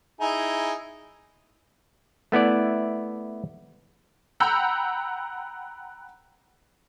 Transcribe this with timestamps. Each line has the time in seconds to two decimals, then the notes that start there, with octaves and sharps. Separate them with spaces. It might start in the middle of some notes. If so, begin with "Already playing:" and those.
0.21 D#4 E4 G#4
2.32 A3 B3 E4 D5
4.40 F#5 G5 A#5 B5 E6 G6